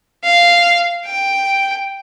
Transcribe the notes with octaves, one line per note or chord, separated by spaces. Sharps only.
F5
G5